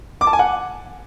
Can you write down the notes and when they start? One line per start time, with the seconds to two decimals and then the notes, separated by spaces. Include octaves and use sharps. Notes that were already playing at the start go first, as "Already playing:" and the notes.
0.21 D6
0.27 A5
0.33 G#5
0.39 F#5